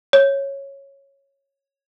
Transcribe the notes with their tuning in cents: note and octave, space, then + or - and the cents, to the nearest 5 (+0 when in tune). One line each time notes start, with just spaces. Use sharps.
C#5 -10